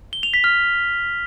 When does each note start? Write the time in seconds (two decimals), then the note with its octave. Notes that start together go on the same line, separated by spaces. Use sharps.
0.13 G7
0.23 F7
0.34 B6
0.44 F6